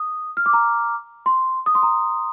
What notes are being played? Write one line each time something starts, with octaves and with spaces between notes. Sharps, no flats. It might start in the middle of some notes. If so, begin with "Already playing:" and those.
Already playing: D#6
F6
D6
A#5
C6
D#6
C6
A#5